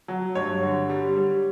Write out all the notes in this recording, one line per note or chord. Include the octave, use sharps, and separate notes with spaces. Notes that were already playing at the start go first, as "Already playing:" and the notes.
F#3
G2 C#5
D3
G3
G3